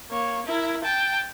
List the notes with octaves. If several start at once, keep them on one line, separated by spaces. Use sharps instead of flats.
A#3 C#5
E4 A#4
G5 A5